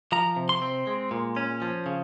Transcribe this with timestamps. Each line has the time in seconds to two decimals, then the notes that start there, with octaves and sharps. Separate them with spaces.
0.12 F3 A#5
0.36 C3
0.49 C6
0.62 C4
0.87 G#3
1.11 A#2
1.36 C#4
1.62 F3
1.86 C#3